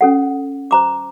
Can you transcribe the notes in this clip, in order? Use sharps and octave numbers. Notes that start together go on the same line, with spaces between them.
C#4 A4 F#5
C5 A#5 D6